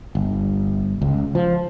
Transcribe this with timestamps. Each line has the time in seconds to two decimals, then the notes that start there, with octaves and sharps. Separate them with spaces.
0.15 G1
1.01 C#2
1.35 F3